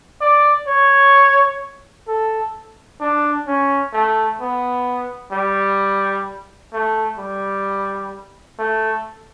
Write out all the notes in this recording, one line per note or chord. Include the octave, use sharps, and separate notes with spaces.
D5
C#5
A4
D4
C#4
A3
B3
G3
A3
G3
A3